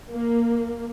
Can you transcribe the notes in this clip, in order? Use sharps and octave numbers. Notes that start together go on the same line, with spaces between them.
A#3